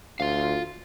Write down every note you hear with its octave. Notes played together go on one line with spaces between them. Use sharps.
D2 F4 F5